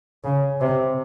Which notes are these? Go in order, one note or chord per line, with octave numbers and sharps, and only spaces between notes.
C#3
C3